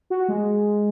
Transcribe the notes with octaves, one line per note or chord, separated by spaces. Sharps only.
F#4
G#3